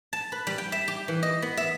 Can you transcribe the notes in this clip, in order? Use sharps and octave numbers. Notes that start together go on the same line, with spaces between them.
A5
B4
G3
G5
E5
G4
E3
D#5
B3
E5